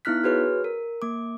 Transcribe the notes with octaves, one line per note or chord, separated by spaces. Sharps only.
B3 D#4 E4 F6 F#6 B6
F#4 G#4 B4 C#5 F6
A#4
A#3 D6